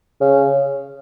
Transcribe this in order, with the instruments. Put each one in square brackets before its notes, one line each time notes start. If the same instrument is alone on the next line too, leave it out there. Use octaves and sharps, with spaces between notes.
[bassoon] C#3